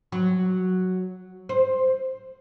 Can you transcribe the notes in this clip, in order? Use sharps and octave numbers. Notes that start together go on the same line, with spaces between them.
F#3
C5